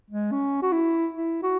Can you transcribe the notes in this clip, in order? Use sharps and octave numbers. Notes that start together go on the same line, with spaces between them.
G#3
C#4
F#4
E4
E4
F#4